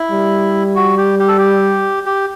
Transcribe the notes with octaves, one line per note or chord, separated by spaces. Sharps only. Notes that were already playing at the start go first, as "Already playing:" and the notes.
Already playing: E4
G3
F#4
G4
G4
A4
G4
G4